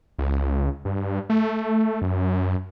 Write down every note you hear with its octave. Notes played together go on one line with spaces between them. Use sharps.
C#2
G2
A3
F#2